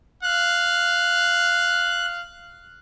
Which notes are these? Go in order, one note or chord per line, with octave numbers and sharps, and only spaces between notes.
F5 F#6